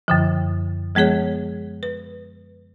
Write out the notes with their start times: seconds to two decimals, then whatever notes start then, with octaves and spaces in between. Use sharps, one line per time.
0.08 F#2 D3 F3
0.95 F3 G#3 B3 G#4 C#5
1.83 B4